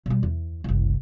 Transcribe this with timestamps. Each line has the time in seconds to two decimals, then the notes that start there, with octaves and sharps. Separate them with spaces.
0.06 B2 G3
0.23 E2
0.64 F#1 C2